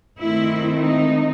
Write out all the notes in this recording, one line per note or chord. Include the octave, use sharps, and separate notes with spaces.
D#3 A3 C4 E4
D#4